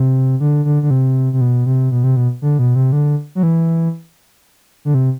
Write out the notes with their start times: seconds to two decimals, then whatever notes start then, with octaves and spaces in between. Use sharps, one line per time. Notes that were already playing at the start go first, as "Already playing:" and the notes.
Already playing: C3
0.40 D3
0.65 D3
0.83 D3
0.90 C3
1.33 C3
1.41 B2
1.66 C3
1.91 B2
2.04 C3
2.17 B2
2.42 D3
2.59 B2
2.75 C3
2.92 D3
3.35 F#3
3.43 E3
4.85 D3
4.94 C3